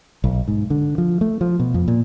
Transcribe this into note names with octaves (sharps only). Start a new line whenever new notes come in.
B1
G#2
D3
F3
A3
F3
B2
F2
A#2